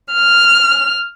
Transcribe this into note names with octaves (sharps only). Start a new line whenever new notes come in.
F6